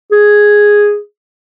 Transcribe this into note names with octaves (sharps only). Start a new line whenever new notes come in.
G#4